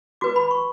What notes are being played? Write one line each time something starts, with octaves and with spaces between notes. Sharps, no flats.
F#4 B4 D6
B5
C#6